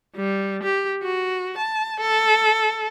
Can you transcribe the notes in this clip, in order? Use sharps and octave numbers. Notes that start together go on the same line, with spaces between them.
G3
G4
F#4
A5
A4